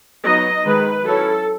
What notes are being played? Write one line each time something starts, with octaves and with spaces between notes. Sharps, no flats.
F#3 B3 D#4 D#5
D#3 G#3 D#4 B4
F#3 C#4 E4 A4